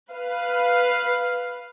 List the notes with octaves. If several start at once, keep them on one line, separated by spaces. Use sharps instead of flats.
B4 F5